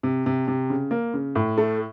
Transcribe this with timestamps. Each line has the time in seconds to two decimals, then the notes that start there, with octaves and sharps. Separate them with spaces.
0.03 C3
0.26 C3
0.48 C3
0.70 C#3
0.91 A#3
1.14 C#3
1.35 A2
1.58 A3